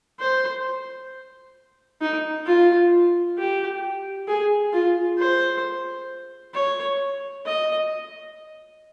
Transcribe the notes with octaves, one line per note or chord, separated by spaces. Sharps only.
C5
D#4
F4
G4
G#4
F4
C5
C#5
D#5